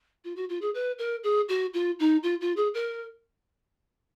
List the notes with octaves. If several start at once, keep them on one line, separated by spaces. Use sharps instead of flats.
F4
F#4
F4
G#4
B4
A#4
G#4
F#4
F4
D#4
F4
F4
G#4
A#4